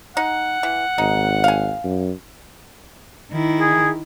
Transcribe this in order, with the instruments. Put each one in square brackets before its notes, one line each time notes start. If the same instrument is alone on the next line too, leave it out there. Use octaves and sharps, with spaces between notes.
[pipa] D#4 [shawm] F#5
[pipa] E3
[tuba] G#1 [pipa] D#4
[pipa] F5 G#5
[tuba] F#2
[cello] D#3 E4
[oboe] G#4